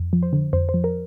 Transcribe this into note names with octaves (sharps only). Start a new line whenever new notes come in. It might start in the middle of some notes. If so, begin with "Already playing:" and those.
Already playing: F2
F3
C5
D3
F2 C5
C5
F3
A#4